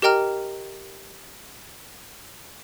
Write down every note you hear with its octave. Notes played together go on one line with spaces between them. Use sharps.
G4 A#4 D#5 G5 A#5 F6